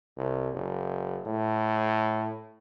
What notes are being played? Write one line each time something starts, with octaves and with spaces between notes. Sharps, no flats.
C2
F#1
A2